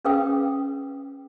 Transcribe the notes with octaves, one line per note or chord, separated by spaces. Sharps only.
C#4 G#4 B4 F5 G5 D#6